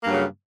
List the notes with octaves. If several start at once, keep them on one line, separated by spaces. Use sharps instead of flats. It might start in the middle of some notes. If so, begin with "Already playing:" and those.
G2 C#3 F#3 A#3